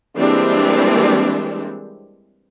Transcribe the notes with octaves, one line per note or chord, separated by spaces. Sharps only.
E3 G3 G#3 A#3 C4 D4